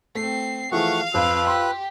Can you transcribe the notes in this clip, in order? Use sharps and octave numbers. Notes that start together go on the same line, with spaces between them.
A3 C4 C7
E3 F3 A3 G#4 F5 F#5 C#6
F2 F4 B4 E6 F#6
G4 C6